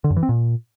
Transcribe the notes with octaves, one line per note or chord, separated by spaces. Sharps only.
D3
F#2
E3
C4
A#2